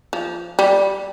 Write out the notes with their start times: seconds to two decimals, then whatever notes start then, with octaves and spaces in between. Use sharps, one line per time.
0.13 F3
0.59 G3